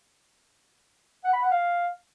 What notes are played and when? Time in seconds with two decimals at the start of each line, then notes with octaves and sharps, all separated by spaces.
1.24 F#5
1.33 B5
1.42 F#5
1.51 F5